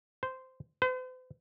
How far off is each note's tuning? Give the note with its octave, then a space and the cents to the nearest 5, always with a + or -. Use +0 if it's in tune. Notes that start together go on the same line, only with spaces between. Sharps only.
C5 -10
C5 -45